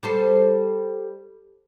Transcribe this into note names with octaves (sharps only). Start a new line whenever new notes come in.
G3 A4 C5